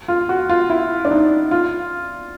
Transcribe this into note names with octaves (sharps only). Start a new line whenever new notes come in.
F4
F#4
F4
E4
D4
D#4
F4